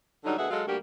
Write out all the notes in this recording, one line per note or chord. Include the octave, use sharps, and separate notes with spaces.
D3 F#3 G3 D#4
D2 B2 G#4 E5 F#5
F#3 G#3 A4 F5
D2 G3 A#3 F#4 G4